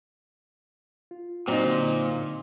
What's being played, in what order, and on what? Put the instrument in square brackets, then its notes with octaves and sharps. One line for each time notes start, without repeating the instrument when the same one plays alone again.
[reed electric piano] F4
[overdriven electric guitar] A#2 [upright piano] F#3 D#4 [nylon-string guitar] C4 [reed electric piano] F#4 D5 A#5
[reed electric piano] D3